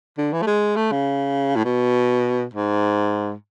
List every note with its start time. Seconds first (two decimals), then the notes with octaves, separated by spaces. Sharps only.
0.18 D3
0.33 E3
0.42 A3
0.47 G#3
0.76 A3
0.91 C#3
1.56 A2
1.65 B2
2.54 G#2